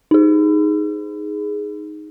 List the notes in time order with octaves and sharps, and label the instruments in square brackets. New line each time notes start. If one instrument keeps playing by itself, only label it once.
[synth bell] D#4 G#4